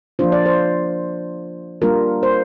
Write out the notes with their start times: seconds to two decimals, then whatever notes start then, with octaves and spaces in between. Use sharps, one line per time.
0.19 F3 A#3 D4 F4 C5
0.32 D5
0.46 C5
1.82 G3 A#3 D4 F4 A#4
2.23 C5